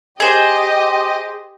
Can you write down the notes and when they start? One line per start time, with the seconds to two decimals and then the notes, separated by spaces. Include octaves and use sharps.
0.20 G4 G#4 C5 D#5